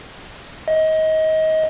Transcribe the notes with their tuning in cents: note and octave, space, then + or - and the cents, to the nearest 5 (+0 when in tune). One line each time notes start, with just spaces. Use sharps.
D#5 +25